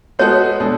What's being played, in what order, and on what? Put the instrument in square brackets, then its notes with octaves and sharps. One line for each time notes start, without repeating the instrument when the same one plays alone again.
[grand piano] G#3 B3 F#4 A4 [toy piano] C#5
[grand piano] B2 G#3 D4 A4